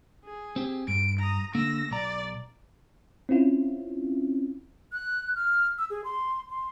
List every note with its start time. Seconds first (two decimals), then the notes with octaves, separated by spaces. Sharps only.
0.25 G#4
0.56 C4 G4
0.88 G2 D7
1.19 A#5 D#6
1.55 D3 A#3 E6 A#6
1.91 B1 D5 A#5
3.29 C4 C#4 E4 F4
4.93 F#6
5.36 F6
5.78 E6
5.90 G#4
6.04 C6
6.50 C6